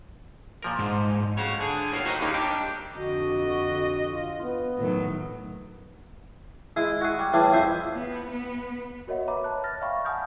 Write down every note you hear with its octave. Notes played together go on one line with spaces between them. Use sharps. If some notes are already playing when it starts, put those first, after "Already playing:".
A#2 F3 A#4
G#2
F2 C#3 C4 F4 F#4 C#5
D3 G#4
A2 G3 A#3 C4 C#4
A#2 D#3 D#4 F#4 C5 D#5
D#2 C#3
G3 C4 D4 D#4 G4
F2 D3 F#4 D#5
F4
B3
A2 D#3 F#3
G#3 E4 G#4
F#4 G#4
G3
A2 E3 G3 G#4 A5
F2 G#4 C5 E5
B3
B3
F#4 A#4 C#5 D#5 E5 F#5
B4 C#5 E5 A#5 B5 D6
A5 F#6
F6 A6 A#6
D5 E5 F5 G5 B5 C#6
F#5 G#5 A5 D#6 F6 G6